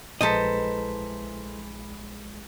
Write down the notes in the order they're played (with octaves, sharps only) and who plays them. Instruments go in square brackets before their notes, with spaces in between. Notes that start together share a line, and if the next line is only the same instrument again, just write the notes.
[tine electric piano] A#1 G#3 B6 [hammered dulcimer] E3 [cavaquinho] A4 C5 A#5 [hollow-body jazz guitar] D#5